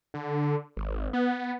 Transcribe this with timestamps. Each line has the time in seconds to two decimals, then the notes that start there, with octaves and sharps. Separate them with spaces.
0.14 D3
0.77 G#1
1.13 B3